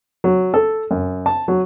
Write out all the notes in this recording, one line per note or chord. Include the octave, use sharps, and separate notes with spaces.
F#3
A4
F#2
A5
F#3